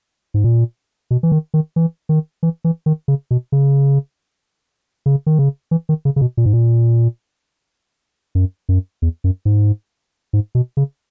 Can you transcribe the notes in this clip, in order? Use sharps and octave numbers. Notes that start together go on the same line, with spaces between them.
G#2
A#2
B2
E3
D#3
D#3
E3
D#3
E3
E3
D#3
C#3
B2
C#3
C#3
D#3
C#3
E3
D#3
C#3
C#3
B2
A#2
G#2
A#2
F#2
F#2
E2
F#2
G#2
G#2
B2
C#3